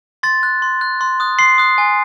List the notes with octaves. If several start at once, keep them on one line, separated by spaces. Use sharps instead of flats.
C6 A6
F#6
C6
F#6
C6
D#6 F#6
C6 C7
D#6 F#6
G#5